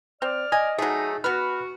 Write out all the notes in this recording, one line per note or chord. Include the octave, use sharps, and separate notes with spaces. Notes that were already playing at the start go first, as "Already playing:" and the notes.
C4 D5 F6
D#5 G#5
F#3 A3 D#4 G#4
B3 F#4 B4 F6